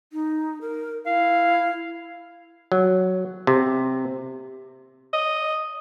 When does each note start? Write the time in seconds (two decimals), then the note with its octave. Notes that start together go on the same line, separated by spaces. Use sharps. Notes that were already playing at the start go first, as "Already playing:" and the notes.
0.13 D#4
0.61 A#4
1.06 E4 F5
2.72 F#3
3.47 C3
5.13 D#5